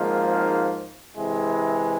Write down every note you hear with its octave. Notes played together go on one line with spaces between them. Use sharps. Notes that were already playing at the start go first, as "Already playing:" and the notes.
Already playing: G#1 G#2 F3 A#3
C3 E3 G#3 E4